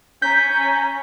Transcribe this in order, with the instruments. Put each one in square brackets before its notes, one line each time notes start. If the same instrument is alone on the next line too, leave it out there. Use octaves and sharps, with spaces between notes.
[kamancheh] C#4 A#5 [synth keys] G6 B6